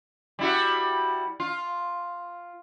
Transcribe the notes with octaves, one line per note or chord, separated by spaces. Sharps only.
G3 E4 F#4
F4